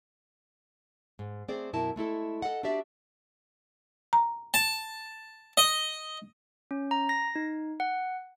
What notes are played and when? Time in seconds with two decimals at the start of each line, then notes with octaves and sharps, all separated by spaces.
1.19 G#2
1.48 A3 C4 G#4 C5 D5
1.73 F#2 B2 E4 A#4 A5
1.96 G#3 A3 E4 A4
2.42 A4 D#5 F#5
2.63 D4 F#4 G4 D5 E5
4.13 A#5
4.54 A5
5.57 D#5
6.71 C#4
6.91 A#5
7.09 A#6
7.35 D#4
7.80 F#5